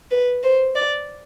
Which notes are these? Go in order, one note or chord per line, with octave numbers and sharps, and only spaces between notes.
B4
C5
D5